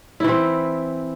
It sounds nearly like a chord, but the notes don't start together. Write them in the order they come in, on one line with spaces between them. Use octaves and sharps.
E4 E3 C4